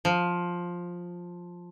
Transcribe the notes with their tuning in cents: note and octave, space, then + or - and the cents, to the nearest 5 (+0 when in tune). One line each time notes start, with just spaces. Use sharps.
F3 +10